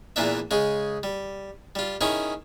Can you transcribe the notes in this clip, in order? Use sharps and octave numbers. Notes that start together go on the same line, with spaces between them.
E2 A#2 E3 A#3 D4 E5
C#3 G#3 G#4
G3
G3 F4
D#3 C#4 E4 G#4